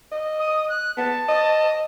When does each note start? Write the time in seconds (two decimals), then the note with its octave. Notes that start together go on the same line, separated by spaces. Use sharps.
0.12 D#5
0.40 D#6
0.69 F#6
0.97 B3 A5
1.28 D#5